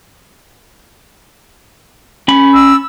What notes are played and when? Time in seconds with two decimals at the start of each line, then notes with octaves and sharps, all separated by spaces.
2.28 C#4 B5
2.54 E6